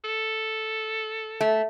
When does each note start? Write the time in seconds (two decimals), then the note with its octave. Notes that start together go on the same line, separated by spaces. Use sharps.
0.04 A4
1.41 A3